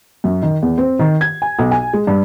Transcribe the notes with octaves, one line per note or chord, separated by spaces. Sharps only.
F#2
D#3
E2
C4
D#3
G#6
G#5
B1
G#5
G#3
G2